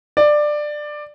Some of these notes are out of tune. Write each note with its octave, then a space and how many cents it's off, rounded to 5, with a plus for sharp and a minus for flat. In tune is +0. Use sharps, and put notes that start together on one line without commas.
D5 +15